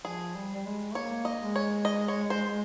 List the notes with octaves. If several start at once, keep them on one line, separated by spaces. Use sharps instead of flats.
F3 G#4
G3
G3
G#3
A#3 C#5
D#5
G#3
C#5
D#5
C#5
C5